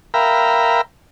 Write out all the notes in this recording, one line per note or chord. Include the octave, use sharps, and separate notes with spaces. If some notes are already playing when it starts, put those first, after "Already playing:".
A#4 E5 F5 G5 A#5 B5